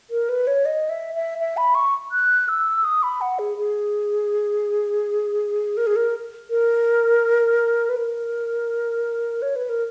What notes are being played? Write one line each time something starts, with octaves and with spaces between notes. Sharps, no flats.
A#4
B4
C#5
D#5
E5
E5
E5
B5
C#6
F#6
E6
D#6
B5
F#5
G#4
G#4
A#4
G#4
A#4
A#4
B4
A#4
C#5
B4
A#4